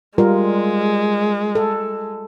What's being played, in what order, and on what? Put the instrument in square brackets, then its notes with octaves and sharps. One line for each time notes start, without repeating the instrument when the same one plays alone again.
[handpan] G3 F4 A#4 [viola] G#3
[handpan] A4